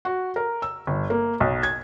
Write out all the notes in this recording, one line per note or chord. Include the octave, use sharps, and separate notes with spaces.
F#4
A#4
E6
G1
A#3
B1
G#6